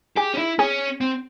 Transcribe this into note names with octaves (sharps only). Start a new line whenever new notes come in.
G4 G#4
C#4
E4
C#4 G#4
C4